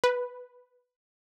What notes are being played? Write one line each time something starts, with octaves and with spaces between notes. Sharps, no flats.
B4